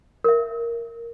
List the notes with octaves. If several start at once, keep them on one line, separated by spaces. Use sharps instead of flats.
A#4 E5